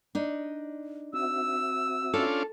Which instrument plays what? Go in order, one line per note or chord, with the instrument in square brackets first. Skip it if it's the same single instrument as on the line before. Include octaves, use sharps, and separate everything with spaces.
[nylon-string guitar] D4 D#4
[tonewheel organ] C4 F#4 E5 [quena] E6
[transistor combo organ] C#4 D4 F4 [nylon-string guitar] A4